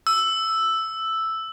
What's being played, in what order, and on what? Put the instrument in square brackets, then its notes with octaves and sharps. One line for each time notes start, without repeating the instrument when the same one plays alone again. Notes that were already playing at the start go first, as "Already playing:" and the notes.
[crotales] E6